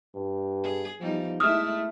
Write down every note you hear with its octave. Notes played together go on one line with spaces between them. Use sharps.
G2
G#4
E2 F3 G3 D#4
G#3 A3 E4 D#6 F6